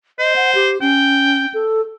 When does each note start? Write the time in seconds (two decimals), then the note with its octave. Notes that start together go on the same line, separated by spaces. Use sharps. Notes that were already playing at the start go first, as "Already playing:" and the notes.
0.19 C5 D#5
0.36 F#5
0.55 G4
0.81 C#4 G5
1.54 A4